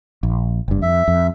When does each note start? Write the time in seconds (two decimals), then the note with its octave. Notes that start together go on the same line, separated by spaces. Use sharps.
0.23 A#1
0.68 F#1 G2
0.82 F2 E5
1.08 F2